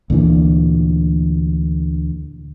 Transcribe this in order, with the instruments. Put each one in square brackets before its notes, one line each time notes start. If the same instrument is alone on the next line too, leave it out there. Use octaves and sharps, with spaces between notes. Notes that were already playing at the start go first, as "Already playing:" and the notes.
[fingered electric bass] D2 A#2 D3 E3